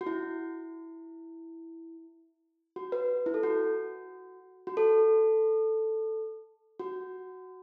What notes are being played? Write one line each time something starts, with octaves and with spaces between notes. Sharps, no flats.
F#4
E4
F#4
B4
E4
A4
F#4
F#4
A4
F#4